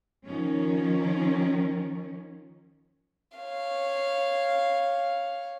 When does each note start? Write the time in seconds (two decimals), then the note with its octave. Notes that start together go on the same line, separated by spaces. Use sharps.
0.25 D#3 F3 C#4
3.37 C#5 F5